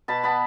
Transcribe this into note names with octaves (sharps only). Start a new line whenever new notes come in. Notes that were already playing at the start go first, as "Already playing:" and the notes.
B2 A5 B5
B3 A5 B5